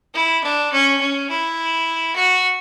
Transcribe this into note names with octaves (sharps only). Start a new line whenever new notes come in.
E4
D4
C#4
C#4
E4
F#4